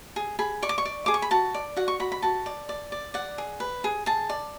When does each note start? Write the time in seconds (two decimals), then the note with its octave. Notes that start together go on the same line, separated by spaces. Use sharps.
0.16 G#4
0.39 G#4 B5
0.62 D5 C#6
0.69 D6
0.78 C#6
0.85 D5
1.06 G#4 D6
1.14 C#6
1.22 B5
1.31 F#4 A5
1.54 D5
1.76 F#4 F#5
1.88 C#6
2.00 F#4 B5
2.12 B5
2.22 F#4 A5
2.46 D5
2.69 D5
2.92 D5
3.14 D5 F#5
3.38 G#4
3.60 B4
3.84 G#4
4.06 G#4 A5
4.29 D5